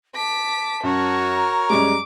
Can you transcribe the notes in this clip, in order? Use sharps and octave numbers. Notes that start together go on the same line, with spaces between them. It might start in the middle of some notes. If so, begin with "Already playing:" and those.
A5 D6 B6
F#2 F#4 A#4 C#5
A#5
F#2 G3 G#3 D6